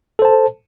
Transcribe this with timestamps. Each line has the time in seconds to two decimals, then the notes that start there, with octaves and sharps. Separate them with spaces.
0.19 A4
0.22 C5
0.25 A5